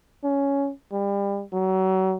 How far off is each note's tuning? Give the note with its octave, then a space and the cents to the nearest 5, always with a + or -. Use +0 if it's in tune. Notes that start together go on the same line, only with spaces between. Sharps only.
C#4 +10
G3 +30
F#3 +30